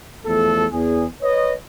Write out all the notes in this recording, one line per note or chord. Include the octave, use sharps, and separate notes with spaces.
E2 F3 A3 A4
E2 G#4
B4 C#5 D#5